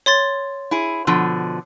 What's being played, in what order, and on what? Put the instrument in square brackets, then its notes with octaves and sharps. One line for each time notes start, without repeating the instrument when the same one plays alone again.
[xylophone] C#5 C6 A6
[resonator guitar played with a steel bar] E4 G#4
B2 D3 F3